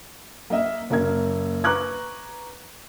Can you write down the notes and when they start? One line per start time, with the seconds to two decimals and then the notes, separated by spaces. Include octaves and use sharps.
0.50 A#3 A#4 D#5 E5
0.90 F#1 F#2 A#3 A#4 G#6
1.64 B4 A#5 C#6 D6 F#6 G#6